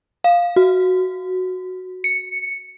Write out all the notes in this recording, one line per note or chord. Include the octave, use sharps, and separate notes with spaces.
F5
F#4
C#7